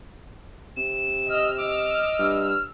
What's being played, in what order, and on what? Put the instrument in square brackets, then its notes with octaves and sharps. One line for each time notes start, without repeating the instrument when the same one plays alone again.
[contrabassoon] C3 [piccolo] E7
[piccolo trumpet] D#5 [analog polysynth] E6 F6
[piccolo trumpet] D#5 [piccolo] D6
[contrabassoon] G2